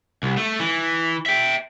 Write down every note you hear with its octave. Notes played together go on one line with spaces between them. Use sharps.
C2
A3
E3
E5 G5